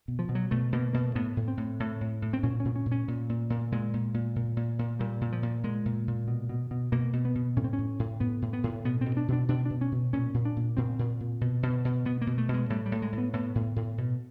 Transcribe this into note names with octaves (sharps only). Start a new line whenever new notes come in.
B2
F3
B2
F#3
B2 A3
B2 A#3
B2 A#3
A2 B3
A2
C4
A2
A2
A2
A2
C4
A#2 C#4
A#2 C#4
C#4
A#2
C#4
A#2
A#2
A#2
A#2 G#3
A#2
A#2
A#2
A#2
A#2
A#2 G3
A#2
F3
A#2
A#2 G#3
A#2
A#2
B2
B2
B2
B2 A#3
B2
B3
B2
A2 C#4
C4
C#4
A2
A2
A2 B3
A2
B3
A2
B2 B3
B2 C4
D4
B2 D4
B2 D4
B2 D4
C#4
B2
A#2 C#4
A#2
D4
A#2
A#2 C4
A#2
A#2
B2
B2
B2
B2 B3
A#3
B2
A3
B2
G#3
A2 G3
G3
A2
G#3
A2
B3
A2 B3
A2
A2
B2